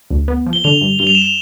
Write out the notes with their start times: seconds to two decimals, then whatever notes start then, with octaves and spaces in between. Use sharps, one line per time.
0.10 D2
0.28 B3
0.46 F3
0.53 G7
0.64 D3 F7
0.81 G2
0.99 G2 G7
1.07 F7
1.15 E7
1.22 F7